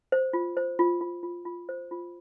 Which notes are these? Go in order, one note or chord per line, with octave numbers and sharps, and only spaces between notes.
C5
F4
C5
F4
F4
F4
F4
C5
F4